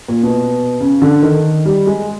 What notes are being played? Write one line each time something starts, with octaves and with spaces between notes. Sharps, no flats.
A#2
B2
C#3
D3
D#3
G3
G#3